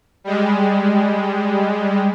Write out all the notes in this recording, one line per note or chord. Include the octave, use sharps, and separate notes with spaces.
G3 G#3